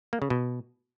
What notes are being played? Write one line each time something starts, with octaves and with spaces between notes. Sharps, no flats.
A#3
C#3
B2